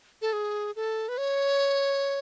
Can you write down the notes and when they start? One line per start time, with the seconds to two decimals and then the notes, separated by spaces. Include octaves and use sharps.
0.22 A4
0.33 G#4
0.76 A4
1.09 B4
1.18 C#5